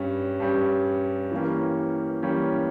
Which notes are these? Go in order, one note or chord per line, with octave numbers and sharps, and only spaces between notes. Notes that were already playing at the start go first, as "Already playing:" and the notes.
Already playing: G2 G3 C#4
G2 G3 C#4
E3 G3 A#3 C#4
E3 G3 A#3 C#4